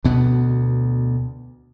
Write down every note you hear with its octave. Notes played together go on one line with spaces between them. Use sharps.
D2 B2 B3